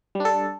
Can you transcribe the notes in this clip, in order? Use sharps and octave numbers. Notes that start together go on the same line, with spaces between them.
G3 D4 A4